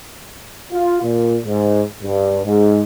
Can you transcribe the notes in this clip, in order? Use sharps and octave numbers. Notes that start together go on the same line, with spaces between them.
F4
A#2
G#2
G2
G#2